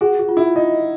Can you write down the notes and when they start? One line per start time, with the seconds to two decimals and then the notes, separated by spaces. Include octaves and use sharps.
0.01 F#4 G#4
0.19 F#4
0.29 F4
0.37 E4
0.56 D#4 D#5